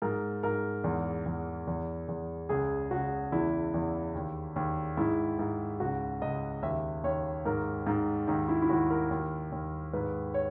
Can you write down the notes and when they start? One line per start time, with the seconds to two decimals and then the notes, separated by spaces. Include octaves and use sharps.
0.02 G#2 A#4
0.43 G#2 A#4
0.84 E2
1.26 E2
1.67 E2
2.08 E2
2.49 C#2 G#4
2.91 C#2 F#4
3.32 E2 E4
3.74 E2
4.15 D#2
4.56 D#2
4.97 G#2 E4
5.39 G#2
5.80 C#2 F#4
6.21 C#2 D#5
6.63 D#2 E5
7.04 D#2 C#5
7.45 G#2 A#4
7.87 G#2 D#4
8.27 D#2 D#4
8.48 E4
8.62 E4
8.69 D#2 F#4
8.90 A#4
9.11 D#2
9.52 D#2
9.93 G#2 B4
10.34 C#5